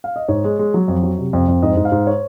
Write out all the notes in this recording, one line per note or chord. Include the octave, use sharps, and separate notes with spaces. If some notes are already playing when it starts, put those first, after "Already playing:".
F5
D#5
G#2 C#5
G#3
G#3
F#3
F2
F#3
C3
F2
F2
G#2 D#5
G#2
F5
G#2
C#5